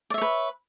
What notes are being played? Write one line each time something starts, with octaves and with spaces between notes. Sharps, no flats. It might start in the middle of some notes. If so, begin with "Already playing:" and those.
B4 C#5 D5 E5